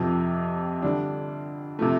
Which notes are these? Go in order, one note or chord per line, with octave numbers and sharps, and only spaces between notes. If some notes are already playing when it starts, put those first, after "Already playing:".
Already playing: F2 C3 F3
D3 G3 D4
C3 F3 A3